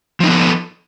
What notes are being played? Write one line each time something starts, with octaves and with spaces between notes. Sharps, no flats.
F3 B3 D#4 A4